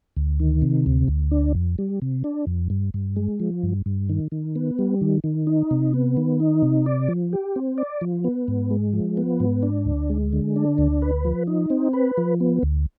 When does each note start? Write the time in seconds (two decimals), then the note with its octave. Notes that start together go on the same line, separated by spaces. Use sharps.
0.17 D2
0.40 D#3
0.62 C3
0.86 D2
1.08 D2
1.31 D4
1.55 F2
1.78 G3
2.02 C3
2.24 D4
2.47 F2
2.70 G2
2.94 G2
3.16 G#3
3.40 F3
3.63 G2
3.86 G2
4.09 D#3
4.32 D#3
4.56 B3
4.79 G3
5.01 D#3
5.24 D#3
5.47 D#4
5.71 C3
5.94 B3
6.17 D#3
6.40 D#4
6.63 C3
6.86 D5
7.08 F3
7.33 G4
7.56 C4
7.78 D5
8.01 F3
8.24 B3
8.48 G#2
8.71 G#3
8.93 F3
9.17 B3
9.40 G#2
9.63 D4
9.85 D2
10.10 G#3
10.33 D3
10.56 D4
10.78 D2
11.02 B4
11.25 F3
11.47 D#4
11.70 C4
11.93 B4
12.18 F3
12.40 B3
12.63 D2